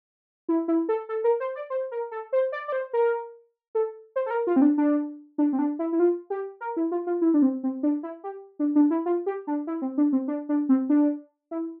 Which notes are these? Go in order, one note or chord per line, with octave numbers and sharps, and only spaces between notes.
E4
E4
A4
A4
A#4
C5
D5
C5
A#4
A4
C5
D5
D5
C5
A#4
A4
C5
A4
A#4
F4
C4
D4
D4
D4
C4
D4
E4
E4
F4
G4
A#4
E4
F4
F4
E4
D4
C4
C4
D4
E4
G4
D4
D4
E4
F4
G4
D4
E4
C4
D4
C4
D4
D4
C4
D4
E4